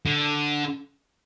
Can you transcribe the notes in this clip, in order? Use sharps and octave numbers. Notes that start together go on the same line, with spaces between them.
D3